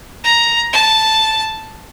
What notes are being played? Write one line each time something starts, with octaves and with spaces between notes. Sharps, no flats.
A#5
A5